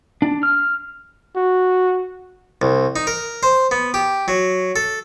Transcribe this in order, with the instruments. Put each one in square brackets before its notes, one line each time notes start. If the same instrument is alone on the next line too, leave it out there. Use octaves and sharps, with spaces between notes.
[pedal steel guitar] D4
F6
[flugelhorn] F#4
[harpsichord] C2
D#4
A#4
C5
B3
G4
F#3
A4